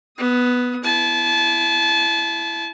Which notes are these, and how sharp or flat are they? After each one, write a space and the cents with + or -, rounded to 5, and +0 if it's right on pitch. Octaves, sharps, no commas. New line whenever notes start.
B3 +0 D#6 +20
E4 +15 A5 -30